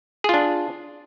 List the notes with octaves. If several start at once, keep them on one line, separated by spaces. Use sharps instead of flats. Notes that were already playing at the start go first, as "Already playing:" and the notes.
D4 F4 G#4